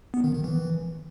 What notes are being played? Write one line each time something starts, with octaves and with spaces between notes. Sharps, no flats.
B3
D#3
D#3
E3